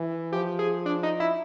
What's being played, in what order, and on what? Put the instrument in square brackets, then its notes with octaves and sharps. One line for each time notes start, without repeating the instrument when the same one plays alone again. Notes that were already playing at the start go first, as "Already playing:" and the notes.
Already playing: [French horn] E3
[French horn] F3 [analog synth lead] G4
[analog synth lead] G#4
D4
D#4
E4